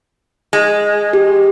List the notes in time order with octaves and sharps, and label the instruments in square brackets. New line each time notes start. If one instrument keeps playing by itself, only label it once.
[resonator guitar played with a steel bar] G#3
[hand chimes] G4